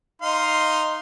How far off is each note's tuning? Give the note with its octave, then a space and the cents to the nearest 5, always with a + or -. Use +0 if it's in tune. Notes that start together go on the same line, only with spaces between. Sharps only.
D#4 +0 F5 +0 C6 +0